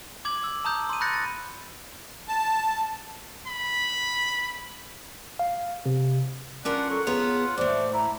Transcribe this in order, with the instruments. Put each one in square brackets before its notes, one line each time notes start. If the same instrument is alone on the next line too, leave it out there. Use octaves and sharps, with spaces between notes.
[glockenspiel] D6 G#6 F#7
E6
A5 A#5 D#6 G6
C6 D#7
B5 F#6 G6 A6 A#6 C#7
A6
[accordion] A5
[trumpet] B5
[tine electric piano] F5
C3
[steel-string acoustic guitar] C#4 F4 A#4 [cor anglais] D4 [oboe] F#5
[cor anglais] F#3 [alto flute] A4
[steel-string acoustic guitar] B3 C#5 A#5 [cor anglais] F4 [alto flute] G#4
[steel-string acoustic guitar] A2 A3 [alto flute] C5 [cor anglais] D5
[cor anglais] E4 [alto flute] A#5